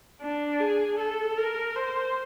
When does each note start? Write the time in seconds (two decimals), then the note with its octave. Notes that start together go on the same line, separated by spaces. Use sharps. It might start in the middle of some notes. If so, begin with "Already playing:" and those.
0.22 D4
0.60 G#4
0.99 A4
1.37 A#4
1.76 C5